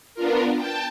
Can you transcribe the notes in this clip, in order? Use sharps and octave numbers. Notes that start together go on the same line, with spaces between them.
B3 D4 F4 A#4
G5 A5